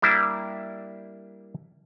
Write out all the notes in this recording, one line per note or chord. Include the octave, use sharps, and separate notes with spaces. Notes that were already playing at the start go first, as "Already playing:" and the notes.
G3 A#3 D4 E4